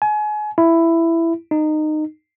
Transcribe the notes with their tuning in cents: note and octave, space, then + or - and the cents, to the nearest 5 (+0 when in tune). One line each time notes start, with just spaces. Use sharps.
G#5 +30
E4 +10
D#4 -20